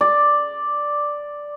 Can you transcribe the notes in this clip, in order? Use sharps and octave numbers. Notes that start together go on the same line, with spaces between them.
D5